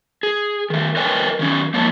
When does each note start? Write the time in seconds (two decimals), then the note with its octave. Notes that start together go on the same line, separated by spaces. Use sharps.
0.23 G#4
0.70 D#3 A3
0.97 A#4 B4 C#5 D#5 G5 G#5
1.39 D#3 F#3 C#4
1.74 G#2 F3 A#3 C#5 A5